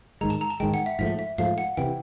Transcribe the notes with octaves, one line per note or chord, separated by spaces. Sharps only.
G#2 D#3 G#3 A#5
A5
A#5
A5
G#2 D#3 G#3 G5
F#5
E5
G#2 F3 A3 E5
E5
G#2 F3 A3 F5
F#5
C3 E3 G5